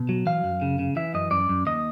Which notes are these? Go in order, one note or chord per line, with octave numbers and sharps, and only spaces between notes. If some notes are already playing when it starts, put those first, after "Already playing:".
Already playing: B2
F#3
E3 F5
F#2
C#3
C#3
E3 E5
F#2 D#5
F#2 D5
F#2
D#2 D#5